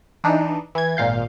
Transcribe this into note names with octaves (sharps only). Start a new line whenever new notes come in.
E3 D4 D#4
E3 G#6
G#1 A#2 F5 G6